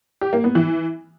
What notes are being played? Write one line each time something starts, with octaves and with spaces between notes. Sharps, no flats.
G4
A#3
B3
E3